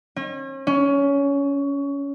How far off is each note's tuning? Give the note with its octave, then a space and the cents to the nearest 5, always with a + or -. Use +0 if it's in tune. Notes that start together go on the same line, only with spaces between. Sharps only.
C#4 -40
C#4 +20